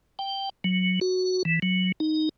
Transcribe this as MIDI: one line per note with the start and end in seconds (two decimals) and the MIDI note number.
0.19 0.50 79
0.64 0.99 54
1.01 1.43 66
1.45 1.59 52
1.62 1.92 54
2.00 2.29 63